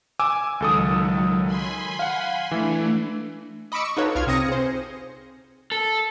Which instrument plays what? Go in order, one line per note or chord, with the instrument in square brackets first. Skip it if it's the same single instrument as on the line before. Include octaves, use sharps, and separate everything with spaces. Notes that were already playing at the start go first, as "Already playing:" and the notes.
[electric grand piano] G#5 D6 E6
[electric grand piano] C#2 A4 D#6 [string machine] D#3 F#3
[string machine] G#5 B5 C6
[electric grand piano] F5 F#5
[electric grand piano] E3 E4 [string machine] A3 D4
[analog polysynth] D#5 B5 C#6 D6 E6 C#7
C#6
D#4 F4 F#4 A4 B4 C#5
C2 F4 F6 G#6
C3 C4 D#6 A#6 C#7
G#4 C5
[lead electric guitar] A4